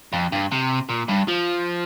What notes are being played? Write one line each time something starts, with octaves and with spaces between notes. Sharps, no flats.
F2
G2
C3
A#2
G2
F3